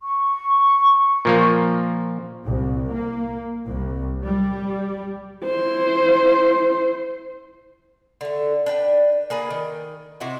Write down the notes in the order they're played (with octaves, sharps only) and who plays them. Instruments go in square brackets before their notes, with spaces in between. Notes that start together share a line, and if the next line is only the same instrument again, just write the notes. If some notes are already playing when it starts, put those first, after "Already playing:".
[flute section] C#6
[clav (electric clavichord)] A#2 F3 A#3
[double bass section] C2
A#3
C2
G3
[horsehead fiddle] E4 C5
[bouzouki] D3 A3
D4 B4 G5
A#3 G#4 B4 D5
D#3
C3 E4 F#4 D#5